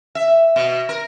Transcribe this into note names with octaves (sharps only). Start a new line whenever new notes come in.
E5
B2
A#4